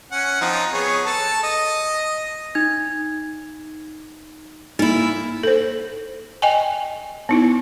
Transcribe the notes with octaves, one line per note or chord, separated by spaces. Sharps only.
C#4 F#5
F3 C4 D#4
B3 G#4 C#5
A4 A5
D#5
D#4 G#6
A#3 D#4 E4
A4 C5
D#5 G5 G#5
B3 D#4 E4